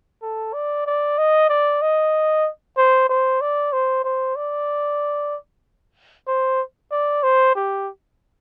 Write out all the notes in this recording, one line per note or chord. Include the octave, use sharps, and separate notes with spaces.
A4
D5
D5
D#5
D5
D#5
C5
C5
D5
C5
C5
D5
C5
D5
C5
G4